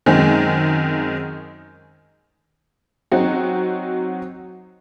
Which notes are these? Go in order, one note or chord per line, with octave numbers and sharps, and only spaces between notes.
F#2 D#3 G#3 C4
F#3 C4 D#4 F#4